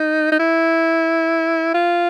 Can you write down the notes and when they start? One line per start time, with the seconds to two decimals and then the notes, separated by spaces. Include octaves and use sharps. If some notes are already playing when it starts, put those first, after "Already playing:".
Already playing: D#4
0.32 D#4
0.40 E4
1.74 F4